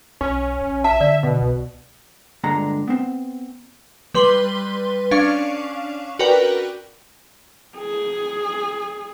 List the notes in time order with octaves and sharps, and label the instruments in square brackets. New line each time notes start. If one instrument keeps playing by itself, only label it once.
[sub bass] B1 [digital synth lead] C#4
[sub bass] A#1
[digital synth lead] E5 [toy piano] A5
[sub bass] D3 [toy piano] D5
[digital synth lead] B2 [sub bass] D3
[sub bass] C2
[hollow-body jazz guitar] G2 A#2 D3 G#3 A#5
B3 C4
[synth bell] G3 B4 C6 G7
C#4 D4 F5 C#6
F#4 A#4 B4 D5 G5
[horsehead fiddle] G#4